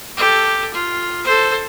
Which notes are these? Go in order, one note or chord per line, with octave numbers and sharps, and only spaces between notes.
G4 A4
F4
A4 C5